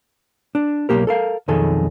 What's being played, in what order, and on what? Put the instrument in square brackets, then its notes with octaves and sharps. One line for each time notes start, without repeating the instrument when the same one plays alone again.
[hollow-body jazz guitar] D4
B1 A#2 A#3 G4 A#4
A4 A#4 F5
B1 F2 D#3 G#4 A4